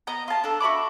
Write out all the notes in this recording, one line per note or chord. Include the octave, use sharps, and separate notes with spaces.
B3 D#5 A#5
F4 A5
D4 A4
F#4 E5 B5 D6